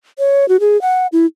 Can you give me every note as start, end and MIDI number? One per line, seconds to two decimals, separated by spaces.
0.19 0.48 73
0.49 0.60 66
0.60 0.80 68
0.82 1.07 78
1.12 1.26 64